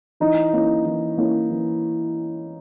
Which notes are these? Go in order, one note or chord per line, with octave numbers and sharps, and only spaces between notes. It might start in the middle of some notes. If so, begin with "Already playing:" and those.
E3 D#4
A#3 C#4 E4
E3
A#3 C#4 E4
E3